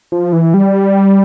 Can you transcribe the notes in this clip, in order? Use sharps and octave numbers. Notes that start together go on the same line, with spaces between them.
F3
E3
G3